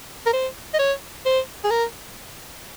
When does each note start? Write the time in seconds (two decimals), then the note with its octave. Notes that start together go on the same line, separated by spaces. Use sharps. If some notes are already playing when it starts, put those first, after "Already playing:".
0.26 A#4
0.33 C5
0.74 D#5
0.79 C#5
1.25 C5
1.64 G#4
1.70 A#4